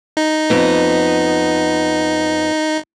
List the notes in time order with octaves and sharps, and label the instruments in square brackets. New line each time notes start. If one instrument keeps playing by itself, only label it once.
[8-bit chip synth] D#4
[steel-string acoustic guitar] F2 B3